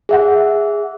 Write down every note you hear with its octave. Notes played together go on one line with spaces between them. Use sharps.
G#4 E5 F#5